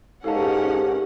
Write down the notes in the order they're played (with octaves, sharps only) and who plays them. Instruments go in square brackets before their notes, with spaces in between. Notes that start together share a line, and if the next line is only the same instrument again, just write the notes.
[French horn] G#2 [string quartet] C#4 A#4 F#5 [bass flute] G4 [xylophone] A4 F5 A5